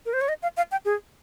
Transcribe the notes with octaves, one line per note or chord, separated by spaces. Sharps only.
A#4
C5
C#5
D#5
F5
F5
G5
G#4